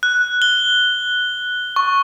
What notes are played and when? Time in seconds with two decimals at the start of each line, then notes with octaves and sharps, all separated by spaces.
0.03 F#6
0.42 G7
1.76 C#6